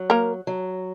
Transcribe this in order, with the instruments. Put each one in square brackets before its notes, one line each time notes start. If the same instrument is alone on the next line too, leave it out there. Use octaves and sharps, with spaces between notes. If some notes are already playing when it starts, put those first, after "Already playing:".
Already playing: [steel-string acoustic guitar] F#3
[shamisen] A#3 A#4
[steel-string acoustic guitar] F#3